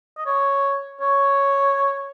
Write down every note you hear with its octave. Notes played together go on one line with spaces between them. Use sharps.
D#5
C#5
C#5